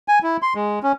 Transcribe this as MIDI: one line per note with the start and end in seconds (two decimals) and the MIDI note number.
0.08 0.19 80
0.23 0.37 64
0.42 0.54 84
0.55 0.79 56
0.83 0.92 61